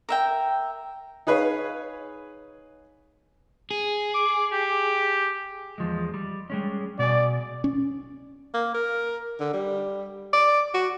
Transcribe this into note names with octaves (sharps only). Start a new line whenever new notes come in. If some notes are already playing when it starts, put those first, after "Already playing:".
A#4 E5 G5
D#4 G#4 B4 C#5 F5
G#4
D6
G4
E2 F3 G#3
G3
G3 G#3 C#4
B2 D5 G#5
C#4
A#3
A#4
D3
G3
D5
F#4